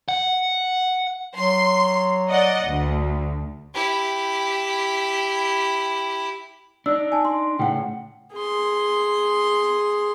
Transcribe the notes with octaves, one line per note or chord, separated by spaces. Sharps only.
F#5
F#3 C6
D5 D#5 F#5
D2
E4 G4
D4 D#4 E6
G#5 A5
C6
A2 C#3 F#5 G5
G#4 C6